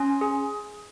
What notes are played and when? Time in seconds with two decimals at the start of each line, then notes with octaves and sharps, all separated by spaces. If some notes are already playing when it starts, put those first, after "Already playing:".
Already playing: C#4 G#5 C6
0.21 G#4